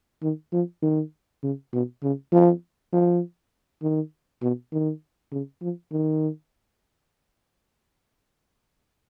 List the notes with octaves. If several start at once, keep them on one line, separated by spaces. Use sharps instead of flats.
D#3
F3
D#3
C#3
B2
C#3
F3
F3
D#3
B2
D#3
C#3
F3
D#3